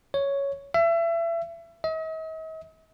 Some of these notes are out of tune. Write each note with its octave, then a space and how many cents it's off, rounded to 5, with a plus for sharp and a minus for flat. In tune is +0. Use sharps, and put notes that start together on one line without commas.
C#5 +5
E5 +30
D#5 +45